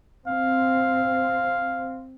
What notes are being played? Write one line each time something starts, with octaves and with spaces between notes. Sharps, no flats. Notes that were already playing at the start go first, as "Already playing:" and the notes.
C4 F5